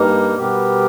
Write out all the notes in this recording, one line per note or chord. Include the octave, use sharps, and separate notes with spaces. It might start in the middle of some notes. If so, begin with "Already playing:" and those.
Already playing: G2 G3 A#3 D#4 A#4
B2 G3 B3 G4 A#4